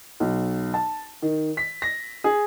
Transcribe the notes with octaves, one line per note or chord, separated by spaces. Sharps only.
B1
A5
D#3
B6
A#6
G#4